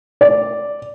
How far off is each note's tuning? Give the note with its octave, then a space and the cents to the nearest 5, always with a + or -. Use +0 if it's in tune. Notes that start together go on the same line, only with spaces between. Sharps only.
D5 -5